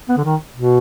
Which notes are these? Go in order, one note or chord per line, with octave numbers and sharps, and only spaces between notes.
B3
D3
D#3
B2